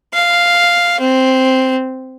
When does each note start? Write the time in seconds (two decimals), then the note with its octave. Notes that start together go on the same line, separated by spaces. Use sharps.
0.14 F5
1.00 C4